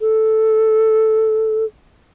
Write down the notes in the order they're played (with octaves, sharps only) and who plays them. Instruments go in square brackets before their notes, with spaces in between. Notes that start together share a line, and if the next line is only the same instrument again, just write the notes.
[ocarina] A4